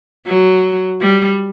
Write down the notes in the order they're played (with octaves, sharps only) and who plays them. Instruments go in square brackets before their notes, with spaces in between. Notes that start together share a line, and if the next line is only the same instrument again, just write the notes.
[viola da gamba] F#3
G3